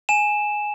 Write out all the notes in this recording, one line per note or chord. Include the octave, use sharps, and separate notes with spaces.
G#5 E7